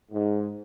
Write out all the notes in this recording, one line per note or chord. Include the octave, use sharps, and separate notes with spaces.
G#2